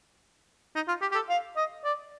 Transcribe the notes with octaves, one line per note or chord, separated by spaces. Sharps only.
D#4
F4
G4
G4
A4
F5
D#5
D5